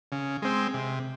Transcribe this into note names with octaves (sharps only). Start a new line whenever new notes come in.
C#3
G#3 C4
C3